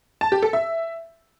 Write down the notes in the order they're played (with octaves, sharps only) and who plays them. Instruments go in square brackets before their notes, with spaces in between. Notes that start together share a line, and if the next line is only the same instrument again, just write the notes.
[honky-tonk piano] A5
G4
A4
E5